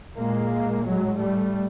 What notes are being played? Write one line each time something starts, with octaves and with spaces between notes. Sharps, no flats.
A#2 G#3 A#3
A2 F#3 G#3
G3 A3